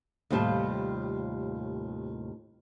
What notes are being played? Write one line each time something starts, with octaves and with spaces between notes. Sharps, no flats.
D#2 A2 C3 G3 F4 A5